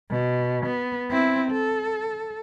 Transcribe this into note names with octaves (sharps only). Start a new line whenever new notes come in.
B2
B3
C4 E4
A4